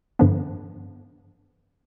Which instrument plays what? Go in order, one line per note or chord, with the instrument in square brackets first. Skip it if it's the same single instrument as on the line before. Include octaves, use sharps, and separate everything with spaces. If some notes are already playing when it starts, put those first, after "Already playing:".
[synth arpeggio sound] G2 D3 F3 B3 D4